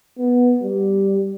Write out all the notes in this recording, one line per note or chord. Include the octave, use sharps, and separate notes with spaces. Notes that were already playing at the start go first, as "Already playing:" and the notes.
B3
G3